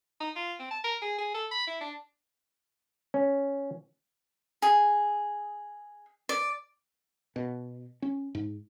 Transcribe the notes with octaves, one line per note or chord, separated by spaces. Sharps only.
D#4
F4
C4
A5
A#4
G#4
G#4
A4
B5
E4
D4
C#4
G#4
D5
B2
C#4
G#2